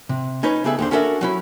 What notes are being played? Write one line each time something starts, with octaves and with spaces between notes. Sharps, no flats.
C3
C#4 D#4 B4 C#5
C#3 G3 B3 G#4 A4 E5
D#2 D3 C5
C#4 D4 F#4 A4 A#4 E5
F#3 C#4 E4